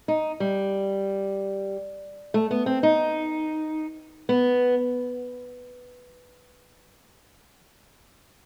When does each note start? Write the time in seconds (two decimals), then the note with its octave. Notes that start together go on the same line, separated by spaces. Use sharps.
0.08 D#4
0.40 G3
2.34 A3
2.51 B3
2.66 C4
2.83 D#4
4.29 B3